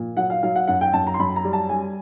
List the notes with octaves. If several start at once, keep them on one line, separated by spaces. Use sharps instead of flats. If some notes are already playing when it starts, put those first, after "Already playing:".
Already playing: A#2 F3
F#3 F#5
F5
F#3 F5
F#5
F#2 F#5
G5
F#2 A5
A#5
C6
F#2 B5
A#5
G3
A5
G3 G#5